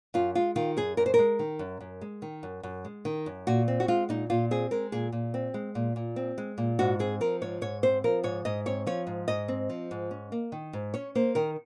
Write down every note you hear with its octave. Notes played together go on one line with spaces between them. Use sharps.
F#2 F4
G#3 F4
D#3 F4
F#2 G#4
F#2 A#4
C5
G#3 A#4
D#3
F#2
F#2
G#3
D#3
F#2
F#2
G#3
D#3
F#2
A#2 F#4
C4
F#4
G#3 F4
A#2 D#4
A#2 F4
C4 G#4
G#3 A#4
A#2 G#4
A#2
C4
G#3
A#2
A#2
C4
G#3
A#2
G#2 F#4
C4 G#4
F3 A#4
G#2 C#5
G#2 C#5
C4 C5
F3 A#4
G#2 C#5
G#2 D#5
C4 C#5
F3 C#5
G#2
G#2 D#5
C4
F3
G#2
C#4
A#3
D#3
G#2
C#4 C#5
A#3 C5
D#3 A#4